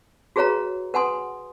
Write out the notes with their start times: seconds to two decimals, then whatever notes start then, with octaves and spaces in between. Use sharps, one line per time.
0.36 F#4 G#4 B4 C#5 F5 A#5
0.94 B4 F#5 G#5 C6 D#6